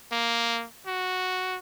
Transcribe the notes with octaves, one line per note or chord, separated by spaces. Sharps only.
A#3
F#4